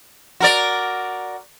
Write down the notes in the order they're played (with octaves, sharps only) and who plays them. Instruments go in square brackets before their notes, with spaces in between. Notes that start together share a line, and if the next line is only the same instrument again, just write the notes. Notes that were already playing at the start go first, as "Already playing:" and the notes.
[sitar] F#4 A#4 D5